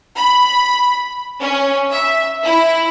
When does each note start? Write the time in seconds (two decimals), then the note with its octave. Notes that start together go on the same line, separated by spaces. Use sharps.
0.17 B5
1.42 C#4
1.91 E5
2.45 E4